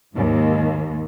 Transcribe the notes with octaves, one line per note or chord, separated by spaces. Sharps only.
D#2 G#2